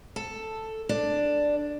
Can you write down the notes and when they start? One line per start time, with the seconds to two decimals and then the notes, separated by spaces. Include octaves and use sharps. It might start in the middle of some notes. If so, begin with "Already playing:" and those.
0.16 A4
0.89 D4